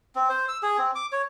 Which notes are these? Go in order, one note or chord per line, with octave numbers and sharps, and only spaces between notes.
C4
C5
E6
G#4
C4
D6
C#5